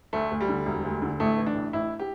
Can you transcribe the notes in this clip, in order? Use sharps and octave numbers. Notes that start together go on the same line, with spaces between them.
D2 A3
D2
G3
D3
E1
D2
D3
A1 A3
E3
D4
A1
A1 E4
G4